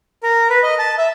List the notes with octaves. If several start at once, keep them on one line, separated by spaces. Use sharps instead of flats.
A#4
B4
D#5
A5
E5